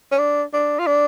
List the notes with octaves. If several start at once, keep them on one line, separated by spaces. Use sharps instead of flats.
C#4
D4
D4
F4
D4